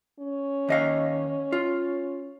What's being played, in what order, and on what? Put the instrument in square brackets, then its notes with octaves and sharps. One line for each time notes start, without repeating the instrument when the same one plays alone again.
[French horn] C#4
[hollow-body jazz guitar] D#2 D#5 F5
F4